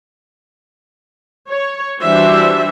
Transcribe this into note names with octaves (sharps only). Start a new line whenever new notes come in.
C#5
E3 G3 D4 F#4 C5 E5